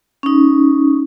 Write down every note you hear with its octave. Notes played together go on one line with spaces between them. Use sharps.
C#4 D#4